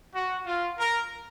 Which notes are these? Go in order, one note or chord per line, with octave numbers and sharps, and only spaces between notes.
F#4
F4
A#4